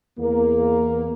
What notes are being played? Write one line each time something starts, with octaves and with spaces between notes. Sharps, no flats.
E2 A#3